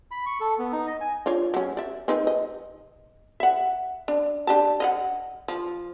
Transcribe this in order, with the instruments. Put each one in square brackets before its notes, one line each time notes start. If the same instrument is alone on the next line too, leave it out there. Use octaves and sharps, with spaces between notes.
[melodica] B5
C#6
A4
B3
D#4
D#5
G#5
[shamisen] D4 F4 C#5
F#3 C#4
D5 E5
C4 D#4 B4
D#5
E5 F#5
D4
D4 G4 A5
D#5 F5 F#5
F3